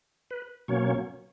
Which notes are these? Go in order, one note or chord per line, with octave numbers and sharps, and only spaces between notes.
B4
B2 F#3 A#3 C#4 C#5